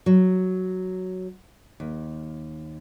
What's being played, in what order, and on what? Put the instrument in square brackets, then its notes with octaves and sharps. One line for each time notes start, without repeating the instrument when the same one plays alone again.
[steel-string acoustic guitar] F#3
D#2